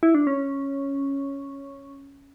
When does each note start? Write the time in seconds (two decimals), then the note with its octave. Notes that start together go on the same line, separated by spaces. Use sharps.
0.03 E4
0.15 D4
0.27 C#4